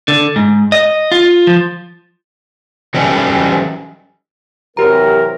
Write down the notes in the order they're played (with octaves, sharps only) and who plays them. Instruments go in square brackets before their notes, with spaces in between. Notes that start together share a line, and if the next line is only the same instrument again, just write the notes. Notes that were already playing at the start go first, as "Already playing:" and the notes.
[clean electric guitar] D3
G#2
D#5
F4
F3
[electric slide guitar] E3 F#3 G3 A3 C#4
[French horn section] C3 E3 F#3 [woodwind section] C4 A#4 [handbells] G4 A#5